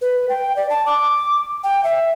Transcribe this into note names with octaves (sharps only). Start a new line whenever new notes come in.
B4
G5
D5
A5
D6
G5
E5